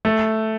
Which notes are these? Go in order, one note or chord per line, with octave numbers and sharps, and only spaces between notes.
A3